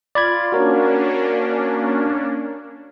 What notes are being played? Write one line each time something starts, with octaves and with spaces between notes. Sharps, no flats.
F4 D5 B5 G#6
A#3 C#4 D4 F#4 A#4 C#5